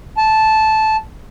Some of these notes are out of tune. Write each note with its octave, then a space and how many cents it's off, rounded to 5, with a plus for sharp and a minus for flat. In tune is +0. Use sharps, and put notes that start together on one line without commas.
A5 -10